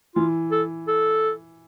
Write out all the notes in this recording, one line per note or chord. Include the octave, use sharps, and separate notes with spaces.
E3 F4
A4
A4